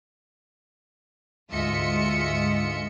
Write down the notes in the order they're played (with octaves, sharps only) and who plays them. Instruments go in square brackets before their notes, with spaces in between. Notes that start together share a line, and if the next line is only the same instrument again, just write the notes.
[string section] D2 G#2 F4 D#5 E5 C#7